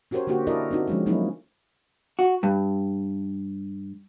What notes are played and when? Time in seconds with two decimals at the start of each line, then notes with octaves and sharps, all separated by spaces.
0.11 C#4 F#4 G4 A#4 C5 C#5
0.27 D3 A3 A#3 F#4 G4
0.47 E4 A4 A#4 D5 D#5
0.71 C4 C#4 D#4 F#4
0.87 F3 G#3 C#4
1.06 F#3 A3 A#3 C#4 D#4 E4
2.19 F#4
2.43 G2